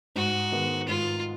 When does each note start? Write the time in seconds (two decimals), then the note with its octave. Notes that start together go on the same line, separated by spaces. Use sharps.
0.16 G#2 F#4
0.52 D#3 G#3 B3
0.88 G#2 F4